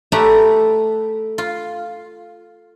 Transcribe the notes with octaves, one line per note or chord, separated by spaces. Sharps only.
A3 G4 B4 D5 E5 A#5
F4